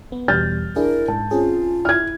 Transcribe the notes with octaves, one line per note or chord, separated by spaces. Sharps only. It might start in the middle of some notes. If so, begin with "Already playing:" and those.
B3
E2 B2 G3 F6 G6 A6
D4 E4 G#4 A#4
G#2 A5
C4 C#4 F4 G#4
E4 F6 G#6